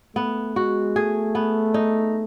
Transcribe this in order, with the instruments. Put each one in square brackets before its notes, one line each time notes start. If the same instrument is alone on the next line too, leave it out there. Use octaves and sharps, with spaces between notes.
[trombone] A3 [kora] B3
[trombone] G#3 [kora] F#4
[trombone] A3 [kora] G#4
[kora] B3
D#4